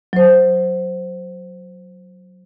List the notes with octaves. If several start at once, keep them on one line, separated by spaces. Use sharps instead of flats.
F#3 C5